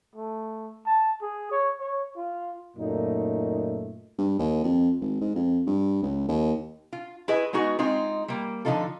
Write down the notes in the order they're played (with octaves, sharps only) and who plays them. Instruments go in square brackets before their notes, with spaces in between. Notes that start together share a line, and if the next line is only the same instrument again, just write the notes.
[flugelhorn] A3
A5
G#4
C#5
C#5
F4
[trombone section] F#2 A#2 A3 D#4
[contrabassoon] G2
D#2
F2
G#1
G#2
F2
G2
C#2
D#2
[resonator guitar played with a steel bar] F4
E4 G#4 B4 D#5
G#3 B3 D#4 F#4 G#4
G#3 C4 D#4 F4
G3 A#3
D3 F3 C4 D#4 F4 A4